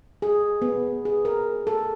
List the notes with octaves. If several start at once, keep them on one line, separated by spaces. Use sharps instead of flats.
G#4
B3
G#4
A#4
A4